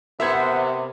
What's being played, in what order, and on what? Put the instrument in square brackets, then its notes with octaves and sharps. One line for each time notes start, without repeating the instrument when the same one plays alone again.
[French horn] C3 [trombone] B3 [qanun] A#4 C5 F#5 [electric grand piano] E5 G#6